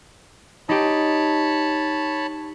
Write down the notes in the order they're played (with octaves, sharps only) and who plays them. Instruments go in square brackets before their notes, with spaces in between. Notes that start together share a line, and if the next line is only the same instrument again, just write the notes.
[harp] D#4 G4 [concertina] C#5 A5 B5